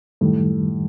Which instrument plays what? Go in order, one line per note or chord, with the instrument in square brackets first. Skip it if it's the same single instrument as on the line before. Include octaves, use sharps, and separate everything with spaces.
[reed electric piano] F#2 D#3 G3 [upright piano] A2